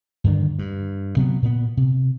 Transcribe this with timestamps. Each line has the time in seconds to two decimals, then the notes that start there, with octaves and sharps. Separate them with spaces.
0.24 G2 D3 D#3 D4
0.59 G2
1.16 C3 F#3 B3
1.42 A#2 B3
1.77 C3